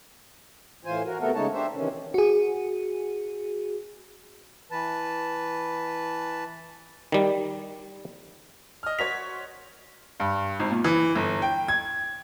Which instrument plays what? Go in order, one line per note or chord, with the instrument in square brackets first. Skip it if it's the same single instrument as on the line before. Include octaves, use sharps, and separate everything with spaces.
[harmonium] A2 E3 F4 C5 G#5
F#4 A#4
C3 A3 B3 F#4 A4 A#4
C#3 G#3 A3 D#4 C#5 A5
D4 G4 C5 E5
C3 D#3 E3 C#4
[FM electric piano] F#4 G#4
[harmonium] E3 B4 A5
[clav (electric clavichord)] D#3 G3
[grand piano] D#5 F6
[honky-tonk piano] F#4 C5 C#5 [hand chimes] B6 [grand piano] F7
[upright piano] G2
G#1
A#2
E3
G1
G5
G#6